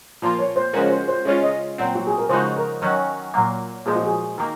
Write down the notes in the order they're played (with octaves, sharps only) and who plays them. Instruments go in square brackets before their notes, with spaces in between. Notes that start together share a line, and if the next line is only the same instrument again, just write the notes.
[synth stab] A#2 F3 A#3 F4
[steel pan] C#5
C5
[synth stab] C#3 F3 G#3 C#4 F#4 [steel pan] A#4
[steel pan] C5
C5
[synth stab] C#3 G#3 C#4 F4 [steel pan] C#5
[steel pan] D#5
[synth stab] A#2 F#3 C4
[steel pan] F#4
G#4
A#4
[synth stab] C#3 F3 G#3 D#4 F#4 [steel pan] C5
[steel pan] A#4
[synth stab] D#3 F#3 C#4 F#4
A#2 F#3 A#3
[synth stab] A#2 F3 G#3 [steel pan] G#4
[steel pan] F#4
G#4
[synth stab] D#3 A#3